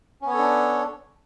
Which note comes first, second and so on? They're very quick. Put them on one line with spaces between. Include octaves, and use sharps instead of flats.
C#4 B3 C#5 A4 D4